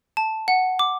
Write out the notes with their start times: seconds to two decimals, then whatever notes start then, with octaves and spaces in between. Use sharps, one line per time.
0.17 A5
0.48 F#5
0.79 D6